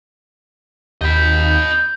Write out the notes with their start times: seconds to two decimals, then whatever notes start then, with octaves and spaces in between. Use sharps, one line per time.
1.01 D#2 D#5 B5 G6